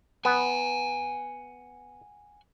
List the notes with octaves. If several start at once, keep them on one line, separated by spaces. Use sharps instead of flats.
B3 F#5 G#5